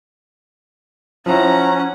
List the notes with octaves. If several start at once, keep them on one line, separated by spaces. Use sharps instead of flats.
F3 C#4 E4 F#5 A#5